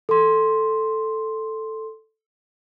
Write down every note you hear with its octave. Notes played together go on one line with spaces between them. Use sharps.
A4 C6